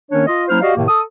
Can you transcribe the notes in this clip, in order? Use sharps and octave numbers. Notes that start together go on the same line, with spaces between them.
D#3 A#3 C#4 D4 C#5
F4 D#5
F#3 A#3 C#4 E4 C5 F6
F#4 G4 D5 D#5 F5
A2 C3 D#3 A#3
A4 D#6